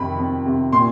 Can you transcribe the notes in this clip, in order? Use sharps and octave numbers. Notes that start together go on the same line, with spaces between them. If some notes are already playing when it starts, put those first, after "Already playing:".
Already playing: F2 C3 D#3 B5
F2
C3
A#2 C6